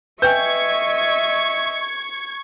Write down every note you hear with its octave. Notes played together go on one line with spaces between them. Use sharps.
B4 D#5 E5 G5 G#5 C#6 G6 G#6